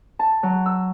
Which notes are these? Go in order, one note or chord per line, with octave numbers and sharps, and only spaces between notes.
A5
F#3
E6